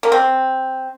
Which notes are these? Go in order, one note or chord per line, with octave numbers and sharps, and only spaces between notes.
A#3
C4